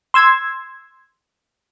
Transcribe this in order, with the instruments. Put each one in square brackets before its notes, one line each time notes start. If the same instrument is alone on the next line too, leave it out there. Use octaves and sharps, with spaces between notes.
[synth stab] C6 E6 G#6